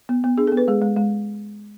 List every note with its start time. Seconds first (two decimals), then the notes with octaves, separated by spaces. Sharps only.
0.09 B3
0.24 B3
0.38 D4 G#4
0.47 A4
0.52 B3
0.57 B4
0.68 G#3 G#4
0.82 G#3
0.97 G#3